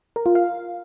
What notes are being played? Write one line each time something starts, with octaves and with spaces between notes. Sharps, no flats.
A#4
F4
F5